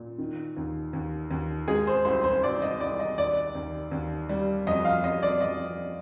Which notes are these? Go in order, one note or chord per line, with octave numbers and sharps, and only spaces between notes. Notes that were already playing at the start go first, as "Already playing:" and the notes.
Already playing: A#2
D#3
D#2
D#2
D#2
G#3 G#4
C5
C2 C5
C5
C2 D5
D#5
C2 D5
D#5
D#2 D5
D#2
D#2
G3
F2 D#5
F5
G3 D#5
D5
F2 D#5